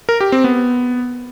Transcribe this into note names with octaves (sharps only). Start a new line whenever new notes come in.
A#4
G4
C4
B3